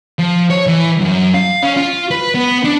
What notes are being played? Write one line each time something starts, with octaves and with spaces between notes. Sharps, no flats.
F3
C#5
E3
F#2
F5
C#4
F4
B4
B3
D4